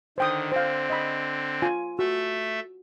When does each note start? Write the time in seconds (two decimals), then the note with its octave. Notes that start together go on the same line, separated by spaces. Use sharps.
0.18 D3 D#3 C5 G5 D#6
0.52 D3 C4 C5 F5
0.90 D#5 B5
1.62 F4 G#5
1.99 A3 F#4 E5